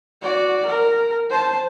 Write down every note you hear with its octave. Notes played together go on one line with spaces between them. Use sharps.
F#4 D5
A#4
C5 A5